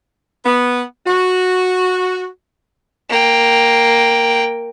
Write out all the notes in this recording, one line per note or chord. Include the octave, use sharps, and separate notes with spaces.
B3
F#4
A#3 G5